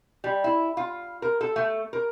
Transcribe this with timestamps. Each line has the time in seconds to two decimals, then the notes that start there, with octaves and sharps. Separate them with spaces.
0.24 G3
0.44 E4
0.77 F4
1.22 A#4
1.41 A4
1.56 A3
1.93 A#4